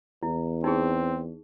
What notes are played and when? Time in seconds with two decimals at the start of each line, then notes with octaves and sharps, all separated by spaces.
0.23 E2 E4
0.64 C4 D#4 G#4